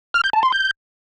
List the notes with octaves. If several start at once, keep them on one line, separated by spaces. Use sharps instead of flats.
F6
G6
A5
C6
G6